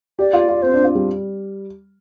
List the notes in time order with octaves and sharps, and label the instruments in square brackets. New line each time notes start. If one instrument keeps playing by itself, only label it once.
[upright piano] G4 [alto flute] D5
[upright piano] F4
F4
[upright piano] C4 [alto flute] C5
[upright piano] D4
F4
G3